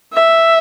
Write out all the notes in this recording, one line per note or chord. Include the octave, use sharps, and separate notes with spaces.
E5